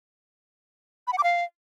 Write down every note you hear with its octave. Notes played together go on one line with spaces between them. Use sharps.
B5
F#5
D6
F5